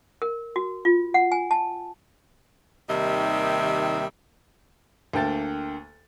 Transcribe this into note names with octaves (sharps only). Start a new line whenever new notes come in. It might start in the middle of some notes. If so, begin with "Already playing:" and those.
A#4
F#4
F4
F#5
G#5
A5
D#2 C3 D#3 G3 D#5 E5
D2 D3 A#3 G5 A5 A6